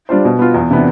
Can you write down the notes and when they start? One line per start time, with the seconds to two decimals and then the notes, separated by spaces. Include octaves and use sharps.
0.09 G3 D4 F4 C5
0.25 B2
0.39 B3 F4
0.54 E2
0.70 C3 E3 B3 D4